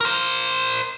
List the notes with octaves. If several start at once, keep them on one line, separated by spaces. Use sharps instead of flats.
A#4 C5